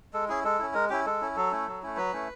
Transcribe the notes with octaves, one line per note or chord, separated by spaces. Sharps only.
G#3 A4
C#4 E4 G#4
G#3 A4
C#4 E4
G#3 A#4
C#4 E4 G4
G#3 A4
C#4 E4
F#3 A4
A3 C#4 E4
F#3
A3 C#4 E4
F#3 B4
A3 C#4 E4